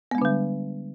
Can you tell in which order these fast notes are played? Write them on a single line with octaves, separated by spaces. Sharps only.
B3 G#3 D4 D3 G3